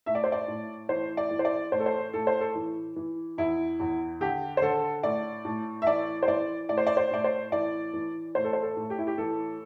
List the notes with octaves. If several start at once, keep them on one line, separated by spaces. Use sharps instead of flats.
A2 E5
D5
C5
D5
A2
E3 C5
D5
E3
C5
D5
A2 C5
A4
C5
A2 A4
C5
A4
E3
E3
E2 E4
E2
D3 G4
C5
D3 A4
A2 D5
A2
E5
E3 D5
C5
E3 D5
A2 D5
C5
D5
C5
A2 D5
C5
E3 D5
E3
A2 C5
A4
C5
A4
A2
G4
E4
G4
E3 A4